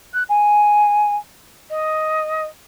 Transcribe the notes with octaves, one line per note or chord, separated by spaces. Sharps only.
F#6
G#5
D#5